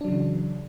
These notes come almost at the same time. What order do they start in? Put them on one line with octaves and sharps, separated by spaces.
D4 F#3 C#3 E3